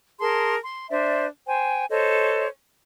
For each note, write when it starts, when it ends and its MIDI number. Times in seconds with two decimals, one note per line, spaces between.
0.20 0.56 68
0.20 0.56 70
0.20 0.56 81
0.20 0.56 84
0.61 0.89 84
0.90 1.25 62
0.90 1.25 72
0.90 1.25 74
0.90 1.25 76
1.48 1.85 72
1.48 1.85 79
1.48 1.85 80
1.90 2.47 69
1.90 2.47 72
1.90 2.47 73
1.90 2.47 75